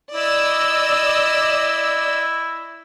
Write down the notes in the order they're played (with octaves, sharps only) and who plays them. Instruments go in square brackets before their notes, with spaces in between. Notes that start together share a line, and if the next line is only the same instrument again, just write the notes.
[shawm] E4 [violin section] D5 D#5 E6